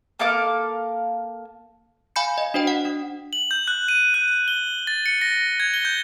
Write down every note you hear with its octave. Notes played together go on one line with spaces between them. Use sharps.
A#3 A4 F5 D6
F5 G#5 B5 G6 C#7
D#5
D4 F#4 C5 D#5 G5
F#5
D4
F#7
G6
F#6
D#7
F#6
G7
A6
C#7
A#6
G#6
G7
G6